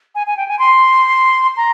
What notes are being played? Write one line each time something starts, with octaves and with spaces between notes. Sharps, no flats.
G#5
G#5
G5
G#5
C6
A#5